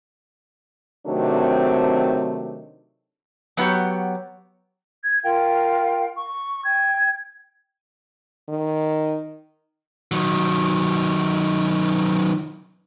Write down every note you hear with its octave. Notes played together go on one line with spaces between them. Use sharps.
C3 D#3 F#3 A3 C4 D4
F#3 B3 F#4 G4 C#5
G#6
F4 A#4 F5 G5
C#6
G5 G#6
D#3
D#3 F#3